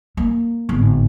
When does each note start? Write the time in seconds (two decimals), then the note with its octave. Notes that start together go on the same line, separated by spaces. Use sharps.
0.17 A#3
0.69 G#1 A2 D3 B3